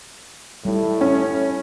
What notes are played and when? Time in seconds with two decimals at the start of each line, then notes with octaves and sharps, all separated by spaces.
0.65 A2 G3 E4
1.01 C#4